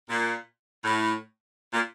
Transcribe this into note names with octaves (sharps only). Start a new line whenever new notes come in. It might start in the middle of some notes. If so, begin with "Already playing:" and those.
A#2
A2
A#2